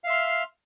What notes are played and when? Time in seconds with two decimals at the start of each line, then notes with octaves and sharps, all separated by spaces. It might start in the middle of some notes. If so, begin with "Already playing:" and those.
0.04 F5
0.07 E5
0.10 C6
0.13 F6